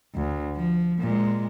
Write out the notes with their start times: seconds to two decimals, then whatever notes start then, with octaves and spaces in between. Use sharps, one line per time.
0.16 D2
0.56 F3
0.99 A#2 G#3